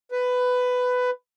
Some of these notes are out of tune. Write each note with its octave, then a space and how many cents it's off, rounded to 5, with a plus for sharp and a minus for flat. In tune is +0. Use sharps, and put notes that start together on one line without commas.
B4 +15